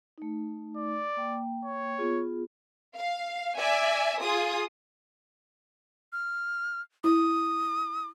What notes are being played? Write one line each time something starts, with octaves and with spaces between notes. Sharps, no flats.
A3 D#4
D5
A#3 G5
C#5
B3 F4 G#4
F5
D5 E5 G#5
F4 G#4 D#6
F6
E4 D#6